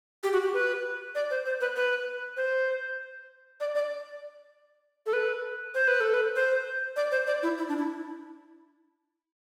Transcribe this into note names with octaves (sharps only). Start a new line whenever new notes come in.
G4
F#4
G4
B4
D5
C5
C5
B4
B4
C5
D5
D5
A4
B4
C5
B4
A4
B4
C5
D5
C5
D5
E4
E4
D4
E4